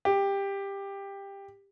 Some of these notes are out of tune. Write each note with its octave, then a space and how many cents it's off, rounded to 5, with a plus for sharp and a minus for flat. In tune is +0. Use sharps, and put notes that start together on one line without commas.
G4 +15